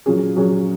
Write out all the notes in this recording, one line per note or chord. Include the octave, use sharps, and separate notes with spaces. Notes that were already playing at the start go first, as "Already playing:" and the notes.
A#2 F#3 C#4 G#4
A#2 F#3 C#4 G#4